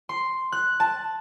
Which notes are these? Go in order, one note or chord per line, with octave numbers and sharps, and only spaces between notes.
C6
F#6
A5